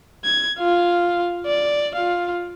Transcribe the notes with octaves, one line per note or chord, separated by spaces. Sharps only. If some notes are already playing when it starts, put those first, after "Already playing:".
G#6
F4 F5
D5
F4 F5